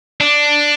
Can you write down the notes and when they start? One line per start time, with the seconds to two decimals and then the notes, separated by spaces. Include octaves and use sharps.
0.21 D4